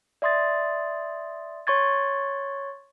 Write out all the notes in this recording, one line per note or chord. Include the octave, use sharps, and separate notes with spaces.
D5 E5 C6 D#6 A6
C#5 C6 C#6 G#6 A6